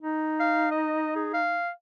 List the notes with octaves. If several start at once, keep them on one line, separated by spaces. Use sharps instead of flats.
D#4
F5
D#5
G#4
F5